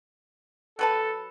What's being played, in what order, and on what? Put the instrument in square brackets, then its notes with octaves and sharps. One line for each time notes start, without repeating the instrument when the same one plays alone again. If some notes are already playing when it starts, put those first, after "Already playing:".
[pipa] F#3 B4 A5 [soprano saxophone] A4